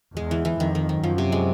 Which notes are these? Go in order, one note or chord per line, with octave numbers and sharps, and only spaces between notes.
E2 G#3
E3
E3
F2 D#3
D#3
D#3
F#2 F3
C3
G#3